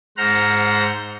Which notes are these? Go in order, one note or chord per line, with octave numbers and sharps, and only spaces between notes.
G#2 C5 F#5 A#5 F6 A#6